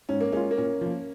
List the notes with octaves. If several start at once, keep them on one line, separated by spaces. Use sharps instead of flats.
G#2 C#4
A#3
G#3 C#4 F4
A#3
A#2 C#4
F3 A#3